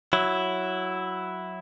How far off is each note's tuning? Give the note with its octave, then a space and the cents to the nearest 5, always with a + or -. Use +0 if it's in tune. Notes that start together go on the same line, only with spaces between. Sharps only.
F#3 +0 E4 +0